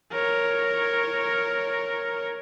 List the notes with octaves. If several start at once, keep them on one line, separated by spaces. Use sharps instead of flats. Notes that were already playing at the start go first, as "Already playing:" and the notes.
A#4 C#5